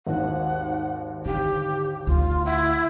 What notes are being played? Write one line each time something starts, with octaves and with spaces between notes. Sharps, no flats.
G#1 D#2 F#5
D3 G4
D2 F4
E4 F#5